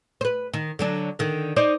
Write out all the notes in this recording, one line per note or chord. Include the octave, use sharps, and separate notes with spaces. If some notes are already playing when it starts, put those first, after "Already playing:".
B4 C5
D#3
D3 F#3 D4
D3 D#3
D#4 C5 D5